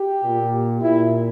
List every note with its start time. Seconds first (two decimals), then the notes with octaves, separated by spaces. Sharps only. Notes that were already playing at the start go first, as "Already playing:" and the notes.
Already playing: G4
0.23 A#2
0.81 A#2 E4